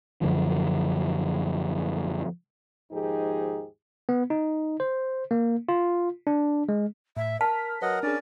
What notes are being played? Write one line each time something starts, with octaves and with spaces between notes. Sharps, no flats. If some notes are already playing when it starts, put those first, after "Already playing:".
F#2 D3 F3
D#2 G#2 F3 D#4 G4 G#4
B3
D#4
C5
A#3
F4
D4
G#3
A2 E5
A#4 A5 F6 B6
F#3 A#4 B4 D#5 F#5
C#4 D4 G#4 D5